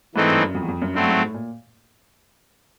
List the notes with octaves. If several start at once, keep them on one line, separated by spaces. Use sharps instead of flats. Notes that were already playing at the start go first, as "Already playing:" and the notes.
G#2 E3 A3 C4 D#4
G2
F#2
F2
E2
F2
F#2
G2 F#3 A3 C4
G#2
A2
A#2